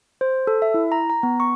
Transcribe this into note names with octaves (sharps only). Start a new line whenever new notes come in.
C5
A4
E5
E4
A#5
A#5
B3
C#6